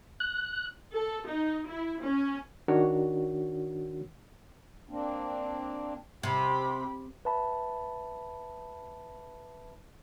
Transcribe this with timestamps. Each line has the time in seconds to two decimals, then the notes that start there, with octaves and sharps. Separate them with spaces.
0.20 F#6
0.95 A4
1.27 D#4
1.66 E4
2.00 C#4
2.68 D#3 D4 F#4 A#4 C#5
4.89 A#3 C4 D4
6.23 C3 G4 B5
7.25 B4 E5 A5 B5